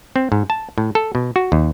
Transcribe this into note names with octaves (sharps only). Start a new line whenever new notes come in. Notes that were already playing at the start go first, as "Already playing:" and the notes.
C4
G#2
A5
A2
A4
B2
F#4
D#2